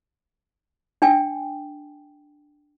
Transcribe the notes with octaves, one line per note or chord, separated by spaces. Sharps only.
D4 G5 G#5